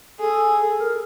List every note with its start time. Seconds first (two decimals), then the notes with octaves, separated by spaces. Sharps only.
0.19 G#4 A4
0.68 A4
0.80 A#4